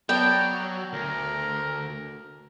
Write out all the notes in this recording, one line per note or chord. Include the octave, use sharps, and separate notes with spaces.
F#3 B3 D5 G5 A5
D2 A#4